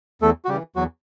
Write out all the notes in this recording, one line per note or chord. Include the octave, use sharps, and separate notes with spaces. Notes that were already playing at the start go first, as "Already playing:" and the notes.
E2 A3 A4
F#4
C#3 E3 G3 G4
E2 F#3 F#4